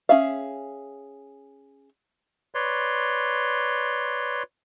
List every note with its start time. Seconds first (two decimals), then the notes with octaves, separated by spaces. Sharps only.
0.09 C#4 G#4 E5 F5
2.55 B4 C#5 D5 C6